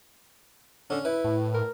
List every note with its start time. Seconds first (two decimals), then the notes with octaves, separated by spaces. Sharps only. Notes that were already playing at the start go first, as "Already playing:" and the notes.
0.90 D3 C#4
1.05 E4 B4
1.24 A2
1.54 A#4